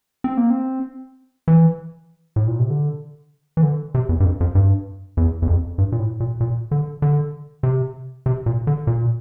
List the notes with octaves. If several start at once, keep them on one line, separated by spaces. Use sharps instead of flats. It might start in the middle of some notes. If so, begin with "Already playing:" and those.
C4
A#3
C4
E3
A2
A#2
C3
D3
E3
D3
C3
E2
G2
F2
F2
G2
E2
E2
F2
G2
A#2
A2
A#2
A#2
D3
D3
C3
C3
A#2
D3
A#2